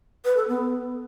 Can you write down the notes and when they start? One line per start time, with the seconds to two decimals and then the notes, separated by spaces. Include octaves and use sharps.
0.25 B4
0.36 A4
0.48 B3